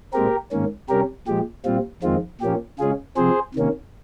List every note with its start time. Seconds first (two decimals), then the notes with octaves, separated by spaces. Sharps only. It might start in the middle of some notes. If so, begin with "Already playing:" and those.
0.13 A#2 G#3 C4 G4 A#4
0.52 G#2 D#3 A#3 C#4
0.89 C3 G3 C#4 G4 A#4
1.27 A#2 F3 G#3 G4
1.65 A#2 G3 C4 F4
2.03 F2 D#3 G#3 C4 F4
2.41 A#2 F3 A#3 C#4 G4
2.79 C#3 G#3 C#4 F4 G#4
3.17 C3 F3 C4 G#4 C5
3.55 C3 D#3 A#3 C#4